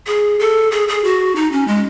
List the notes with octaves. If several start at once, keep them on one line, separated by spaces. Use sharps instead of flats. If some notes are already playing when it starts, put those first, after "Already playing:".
G#4
A4
G#4
G#4
F#4
D#4
C#4
G#3